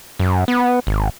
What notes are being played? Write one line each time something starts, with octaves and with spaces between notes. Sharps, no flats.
F#2
B3
G#1